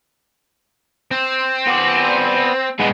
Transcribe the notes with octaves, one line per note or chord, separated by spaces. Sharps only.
C4
B3 D5
G2 B2 G#3 B3